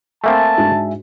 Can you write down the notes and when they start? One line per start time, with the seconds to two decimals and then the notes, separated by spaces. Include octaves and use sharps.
0.24 A3 A#3 C4 E5 G#5 A5
0.58 G#2 D4 F#4